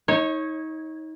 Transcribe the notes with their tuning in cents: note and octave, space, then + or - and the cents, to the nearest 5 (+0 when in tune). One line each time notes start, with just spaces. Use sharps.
D#4 +30 C#5 -15